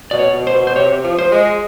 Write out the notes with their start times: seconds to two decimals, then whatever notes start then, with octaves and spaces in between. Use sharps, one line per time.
0.11 B2 D5
0.19 C#5
0.33 B2
0.47 C5
0.54 B2
0.67 C5
0.75 C3 C#5
1.04 F3
1.19 C5
1.32 G#3